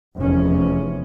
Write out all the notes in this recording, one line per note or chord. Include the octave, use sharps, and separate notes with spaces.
F1 E2 C#4